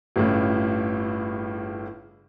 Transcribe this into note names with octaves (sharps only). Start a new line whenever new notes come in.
G1 A2 C#3